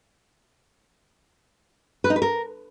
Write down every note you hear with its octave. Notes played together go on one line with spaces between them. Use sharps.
B4
D#4
B4
A#4